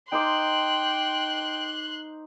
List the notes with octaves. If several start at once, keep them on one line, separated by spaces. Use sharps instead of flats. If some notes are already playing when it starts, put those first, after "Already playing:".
D#4 C5 G5 C6 D6 F#6